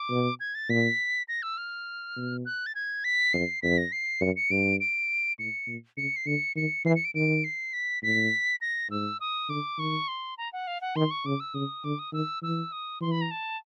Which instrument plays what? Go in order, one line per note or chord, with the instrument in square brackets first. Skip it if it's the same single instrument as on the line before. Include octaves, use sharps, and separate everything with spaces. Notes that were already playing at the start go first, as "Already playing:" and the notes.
Already playing: [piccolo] D6
[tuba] B2
[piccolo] G#6
A6
[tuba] A#2 [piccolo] B6
[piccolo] A#6
E6
F6
[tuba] B2
[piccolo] F#6
A6
G#6
B6
[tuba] F2 [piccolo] C7
[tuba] F2 [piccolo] B6
[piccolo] A#6
C7
[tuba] F#2 [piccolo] C#7
[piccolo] C#7
[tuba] G2 [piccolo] D7
[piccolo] D7
[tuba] A2 [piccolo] C#7
[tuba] A#2
[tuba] C#3 [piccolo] C#7
[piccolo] C7
[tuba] D3 [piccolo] C#7
[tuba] D#3 [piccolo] C#7
[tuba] E3 [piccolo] C7
[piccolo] C#7
D7
[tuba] D#3 [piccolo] D7
[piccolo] C7
B6
[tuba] A2 [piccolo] B6
[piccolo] A#6
[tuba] G#2 [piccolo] E6
[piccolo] D#6
[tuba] D3 [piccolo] D6
[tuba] D#3 [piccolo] C#6
[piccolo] C6
A#5
F#5
F5
F#5
[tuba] D#3 [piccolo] C6
[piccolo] C#6
[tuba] C#3 [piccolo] D6
[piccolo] E6
[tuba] C#3 [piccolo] D#6
[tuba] D3 [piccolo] D6
[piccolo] D#6
[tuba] D#3 [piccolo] E6
[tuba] E3 [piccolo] E6
[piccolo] D#6
[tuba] E3 [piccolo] C6
[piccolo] B5
A#5
A5